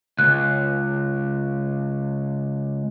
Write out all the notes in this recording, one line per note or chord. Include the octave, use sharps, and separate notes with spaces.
C#2 F#6